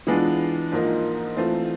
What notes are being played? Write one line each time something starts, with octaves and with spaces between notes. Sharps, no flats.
E3 G#3 B3 D4 F4
G#2 F3 A#3 D#4
E3 A3 C4 F4